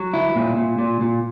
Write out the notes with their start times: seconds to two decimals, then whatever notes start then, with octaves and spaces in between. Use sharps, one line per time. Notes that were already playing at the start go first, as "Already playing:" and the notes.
Already playing: F#3
0.14 E4
0.36 A#2
0.57 A#2
0.79 A#2
1.01 A#2